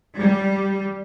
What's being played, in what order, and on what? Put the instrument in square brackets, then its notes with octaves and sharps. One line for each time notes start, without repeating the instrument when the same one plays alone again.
[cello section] G3